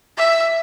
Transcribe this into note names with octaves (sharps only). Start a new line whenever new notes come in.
E5